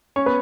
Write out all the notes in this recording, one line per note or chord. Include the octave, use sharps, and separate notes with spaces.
C#4 C#5
B3 B4